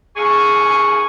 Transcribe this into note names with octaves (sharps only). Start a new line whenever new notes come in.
D#2 G#4 C#6